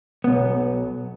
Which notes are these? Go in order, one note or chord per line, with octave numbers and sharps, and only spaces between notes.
B1 B3